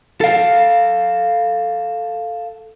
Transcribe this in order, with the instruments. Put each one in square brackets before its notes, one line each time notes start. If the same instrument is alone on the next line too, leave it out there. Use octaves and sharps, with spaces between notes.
[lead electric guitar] A4 F5